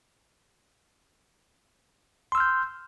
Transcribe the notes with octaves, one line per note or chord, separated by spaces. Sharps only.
C6 E6 F6 G6